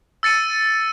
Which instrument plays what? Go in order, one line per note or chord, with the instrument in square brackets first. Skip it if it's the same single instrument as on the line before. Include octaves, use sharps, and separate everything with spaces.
[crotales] E6 A6 C#7 D#7